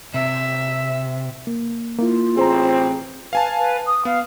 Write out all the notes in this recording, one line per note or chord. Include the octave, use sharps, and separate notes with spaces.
C3 E5
A#3
A#3 E4 F4
A1 C4 G#4 C5 A#5
B4 F5 G#5 A5
B4
D#6
B3 F5